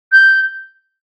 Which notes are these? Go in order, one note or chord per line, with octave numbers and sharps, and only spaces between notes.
G6